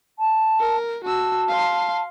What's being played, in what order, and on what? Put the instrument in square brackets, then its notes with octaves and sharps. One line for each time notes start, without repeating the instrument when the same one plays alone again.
[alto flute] A5
[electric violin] A#4
[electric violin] F#4 E6 [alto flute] A5
[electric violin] F5 C6